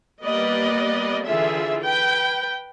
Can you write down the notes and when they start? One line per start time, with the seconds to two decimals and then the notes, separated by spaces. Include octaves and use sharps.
0.23 G3 A#3 B3 B4 D5 D#5
1.24 D3 E3 F4 G#4 A4 E5
1.83 B4 G5